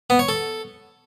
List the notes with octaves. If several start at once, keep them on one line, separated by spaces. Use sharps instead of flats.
B3
C#5
A4